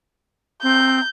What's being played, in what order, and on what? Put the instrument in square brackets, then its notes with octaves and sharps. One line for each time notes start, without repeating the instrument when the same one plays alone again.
[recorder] C4 [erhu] G6